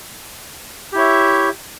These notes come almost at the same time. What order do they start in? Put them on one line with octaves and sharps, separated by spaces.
G4 E4 C#5 E5